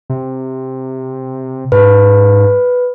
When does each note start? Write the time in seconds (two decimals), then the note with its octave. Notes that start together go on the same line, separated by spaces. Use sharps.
0.10 C3
1.72 G#2 B4